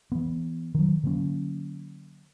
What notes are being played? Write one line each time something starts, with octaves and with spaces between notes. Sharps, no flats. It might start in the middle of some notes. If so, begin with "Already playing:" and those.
E3 B3
D#3 F#3
D3 F#3 A#3 C#4